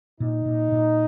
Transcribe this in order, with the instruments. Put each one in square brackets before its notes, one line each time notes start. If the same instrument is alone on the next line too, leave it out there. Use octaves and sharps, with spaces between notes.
[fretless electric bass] A#2 [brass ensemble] D#4
[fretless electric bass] A#2
A#2